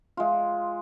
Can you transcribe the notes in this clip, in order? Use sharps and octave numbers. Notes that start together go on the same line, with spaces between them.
G#3 F4